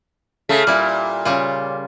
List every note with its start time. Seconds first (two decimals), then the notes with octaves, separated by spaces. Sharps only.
0.49 C#3 A3
0.67 A#2 G3 E4
1.25 C#3 G3 F4